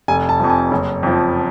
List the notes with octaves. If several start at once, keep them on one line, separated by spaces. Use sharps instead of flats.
F1 G#5
A5
F2 F3
G#5
F#1
F2 F3